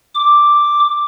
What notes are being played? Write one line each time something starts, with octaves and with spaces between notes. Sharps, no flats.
D6